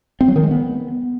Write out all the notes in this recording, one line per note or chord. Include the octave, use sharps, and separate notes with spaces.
C4
F#3
D#3
G#3
B3